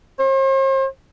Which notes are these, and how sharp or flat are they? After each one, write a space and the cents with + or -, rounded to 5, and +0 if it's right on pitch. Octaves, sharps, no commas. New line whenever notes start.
C5 +45